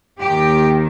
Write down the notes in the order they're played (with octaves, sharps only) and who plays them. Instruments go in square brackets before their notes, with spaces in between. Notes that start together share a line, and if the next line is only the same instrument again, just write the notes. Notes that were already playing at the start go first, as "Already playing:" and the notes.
[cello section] D#2 D#3 G4